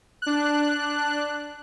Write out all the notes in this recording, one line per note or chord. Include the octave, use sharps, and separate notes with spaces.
D4 F#6